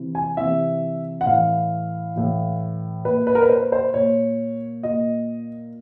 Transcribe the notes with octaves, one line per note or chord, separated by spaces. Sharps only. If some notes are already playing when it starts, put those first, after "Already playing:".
Already playing: C3 E3
G#5
C3 E3 E5
F#5
A2 E3 F5
A2 E3
A#2 B4
B4
A#4
B4
C5
C5
A#2 C#5
A#2 D#5